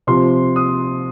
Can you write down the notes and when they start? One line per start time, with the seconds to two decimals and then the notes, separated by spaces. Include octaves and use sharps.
0.07 C3 F3 C6
0.56 D#6